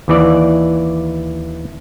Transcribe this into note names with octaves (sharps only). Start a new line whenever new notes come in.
D#2 E3 D5